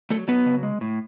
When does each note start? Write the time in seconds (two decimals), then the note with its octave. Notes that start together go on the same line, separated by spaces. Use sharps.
0.10 F#3 A3 A4
0.28 F#3 B3 B4
0.46 C#3
0.63 G#3
0.81 A2